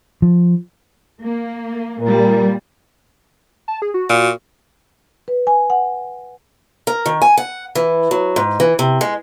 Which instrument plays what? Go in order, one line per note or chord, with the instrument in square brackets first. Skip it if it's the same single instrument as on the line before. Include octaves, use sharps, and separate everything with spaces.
[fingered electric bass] F3
[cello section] A#3
[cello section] A#2 G3 [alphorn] A#4
[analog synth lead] A5
G#4
F#4
[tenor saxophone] A#2
[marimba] B4
G#5
F#5
[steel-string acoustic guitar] A#4
D#3
G#5
F#5
E3
F#3
G#2
E3
C3
G#3